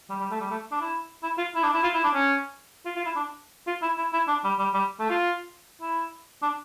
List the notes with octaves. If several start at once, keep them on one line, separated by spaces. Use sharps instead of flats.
G3
G3
A3
G3
A3
D4
E4
E4
F4
E4
D4
E4
F4
E4
D4
C#4
F4
F4
E4
D4
F4
E4
E4
E4
D4
G3
G3
G3
A3
F4
E4
D4